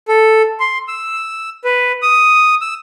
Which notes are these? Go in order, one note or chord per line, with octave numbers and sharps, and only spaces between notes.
A4
C6
E6
B4
D#6
E6